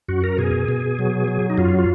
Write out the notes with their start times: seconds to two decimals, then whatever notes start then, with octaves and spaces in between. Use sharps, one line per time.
0.09 F#2 F#4
0.24 A#4
0.38 B2 G#4
0.68 B2
0.99 F#3
1.28 F#3
1.50 D#4
1.58 F#2 F4
1.79 F4